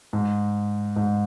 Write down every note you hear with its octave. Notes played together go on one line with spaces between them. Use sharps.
G#2
G#2